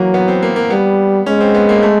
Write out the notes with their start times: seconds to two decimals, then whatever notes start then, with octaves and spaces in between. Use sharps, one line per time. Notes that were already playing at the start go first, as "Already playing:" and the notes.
Already playing: E3 F#3 A#3
0.14 B3
0.28 C4
0.43 A#3
0.56 A#3
0.70 G3 B3
1.26 G#3 C#4
1.41 C4
1.54 B3
1.69 A#3
1.82 A3